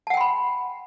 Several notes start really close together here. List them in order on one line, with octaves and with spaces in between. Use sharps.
A5 F#5 G5 C6 B5